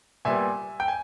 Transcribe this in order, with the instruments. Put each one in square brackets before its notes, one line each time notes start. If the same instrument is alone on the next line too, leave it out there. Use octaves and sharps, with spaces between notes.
[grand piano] A#2 G3 B3 E5 G#5
G5
G#5